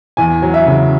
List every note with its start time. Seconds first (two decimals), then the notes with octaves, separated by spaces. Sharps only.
0.17 E2 G#5
0.42 F#3
0.54 E5
0.66 C#3